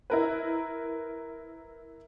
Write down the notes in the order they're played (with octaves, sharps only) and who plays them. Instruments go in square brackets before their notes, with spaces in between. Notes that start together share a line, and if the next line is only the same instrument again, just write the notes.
[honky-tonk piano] E4 A#4 B4